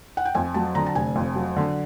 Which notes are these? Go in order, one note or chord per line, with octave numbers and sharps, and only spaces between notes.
F#5
G5
F2 G#5
F#3 A5
D3 A#5
A5
F1 G#5
F2
F#3
D3